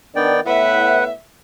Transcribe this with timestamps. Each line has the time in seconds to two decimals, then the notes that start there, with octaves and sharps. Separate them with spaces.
0.16 D#3 B3 D4 D5 G5
0.46 A2 B3 E4 B4 E5 F#5